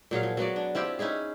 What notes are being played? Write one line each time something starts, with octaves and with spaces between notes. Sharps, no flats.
A#2 F#3 G#4 F5
F3
F#3 B3 F#4 D5
D4
C4 E4 F4 G4
C#4 D#4 E4 G#4